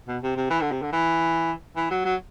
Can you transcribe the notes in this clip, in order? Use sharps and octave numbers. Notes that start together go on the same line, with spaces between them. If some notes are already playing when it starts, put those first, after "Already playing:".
B2
C3
C3
E3
D3
C3
D3
E3
E3
F#3
F#3